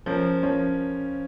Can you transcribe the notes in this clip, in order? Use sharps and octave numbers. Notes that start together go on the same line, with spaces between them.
F3 C#4 A#4
F3 C#4 A#4